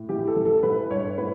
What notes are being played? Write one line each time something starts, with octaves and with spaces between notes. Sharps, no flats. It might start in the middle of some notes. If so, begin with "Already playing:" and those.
Already playing: A2
E3 G4
A4
E3
A4
E3 B4
G2 C#5
A2 B4